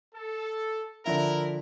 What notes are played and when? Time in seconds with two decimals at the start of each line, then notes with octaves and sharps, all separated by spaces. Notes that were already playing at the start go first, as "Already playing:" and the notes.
0.14 A4
1.06 D3 F3 E4 A#4 E5